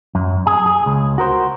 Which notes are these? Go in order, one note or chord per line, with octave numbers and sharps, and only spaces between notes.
F#2
G#4
G#4
C#2
F#4 A#4 C5